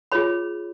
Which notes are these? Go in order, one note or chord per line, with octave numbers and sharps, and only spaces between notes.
F4 G#4 C#5 B5